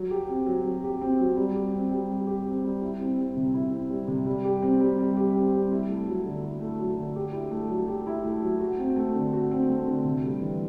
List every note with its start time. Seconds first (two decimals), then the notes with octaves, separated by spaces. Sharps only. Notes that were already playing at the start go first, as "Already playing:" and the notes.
Already playing: F#3
0.11 G4
0.29 C4
0.46 F#3
0.65 F#3
0.83 G4
1.01 C4
1.19 F#3
1.36 G3
1.55 G4
1.73 C4
1.91 G3
2.09 G3
2.27 G4
2.46 C4
2.64 G3
2.82 E4
3.00 C4
3.17 G3
3.37 C3
3.54 E4
3.72 C4
3.90 G3
4.08 C3
4.26 G3
4.44 G4
4.62 C4
4.80 G3
4.98 G3
5.17 G4
5.34 C4
5.53 G3
5.72 E4
5.89 A3
6.08 F#3
6.25 D3
6.43 E4
6.61 A3
6.79 F#3
6.97 D3
7.16 G4
7.33 E4
7.51 A3
7.69 F#3
7.88 G4
8.07 E4
8.24 A3
8.42 F#3
8.60 F#4
8.78 C4
8.96 A3
9.15 D3
9.33 F#4
9.51 C4
9.68 A3
9.87 D3
10.05 C3
10.23 G3
10.41 E3